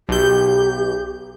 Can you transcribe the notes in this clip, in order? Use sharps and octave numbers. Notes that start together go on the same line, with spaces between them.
B1 G4 G6